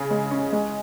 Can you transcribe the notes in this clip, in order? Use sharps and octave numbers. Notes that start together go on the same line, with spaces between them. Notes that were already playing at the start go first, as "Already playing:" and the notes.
Already playing: C#3 G#4
G#3
C#4
G#3